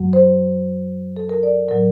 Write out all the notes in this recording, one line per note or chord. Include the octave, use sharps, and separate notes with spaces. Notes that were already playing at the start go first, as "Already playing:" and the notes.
Already playing: F#2 F#3
C5
A4
A#4
D5
A2 F#3 A#4